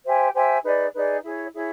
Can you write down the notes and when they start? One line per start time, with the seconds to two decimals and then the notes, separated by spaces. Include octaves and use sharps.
0.05 G4 C5 E5 G#5
0.34 G4 C5 E5 G#5
0.63 D#4 G#4 B4 D5
0.94 D#4 G#4 B4 D5
1.22 E4 G#4 C#5
1.52 E4 G#4 C#5